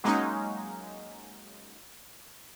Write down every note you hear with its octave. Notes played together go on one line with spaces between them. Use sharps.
F#3 G#3 A#3 C#4 D#4